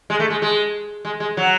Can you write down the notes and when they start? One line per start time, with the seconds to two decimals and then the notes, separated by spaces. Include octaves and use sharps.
0.10 G#3
0.20 A3
0.30 G#3
0.42 G#3
1.05 G#3
1.20 G#3
1.37 F#3